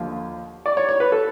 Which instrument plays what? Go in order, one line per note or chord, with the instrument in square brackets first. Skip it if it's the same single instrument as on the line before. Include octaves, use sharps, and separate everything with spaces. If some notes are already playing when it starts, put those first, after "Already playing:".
Already playing: [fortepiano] D#2 D3 F3
D5
C#5
C#5
B4
A4